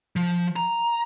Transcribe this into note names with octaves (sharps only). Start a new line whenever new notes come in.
F3
A#5